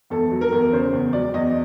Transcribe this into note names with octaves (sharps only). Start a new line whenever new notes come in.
E2 A4
F#3
A#4
E2
C#3 C5
E2
F#3 D5
E2 D#5